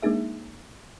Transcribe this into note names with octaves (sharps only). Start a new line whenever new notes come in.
G#3 A#3 D4 D#4 G#4 E5